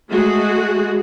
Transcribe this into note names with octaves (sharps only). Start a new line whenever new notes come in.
G#3 A3 F#4 G#4